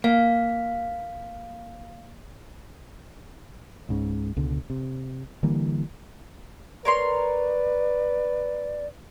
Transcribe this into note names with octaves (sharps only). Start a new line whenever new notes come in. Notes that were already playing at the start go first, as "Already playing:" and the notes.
A#3 F5
C#2 G#2 C#3
C#2 B2 D3
C3
D3 E3 G3 A#3
A#4 B4 C#5 D5 C6